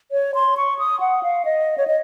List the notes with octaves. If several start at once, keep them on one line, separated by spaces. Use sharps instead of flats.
C#5
C6
C#6
D#6
F#5
F5
D#5
C#5
D#5